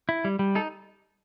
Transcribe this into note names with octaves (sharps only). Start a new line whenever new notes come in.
E4
G3
G3
D#4 A4